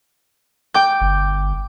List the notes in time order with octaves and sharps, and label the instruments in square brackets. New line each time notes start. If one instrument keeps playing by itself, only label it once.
[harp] G5 D6 G6
[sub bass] G1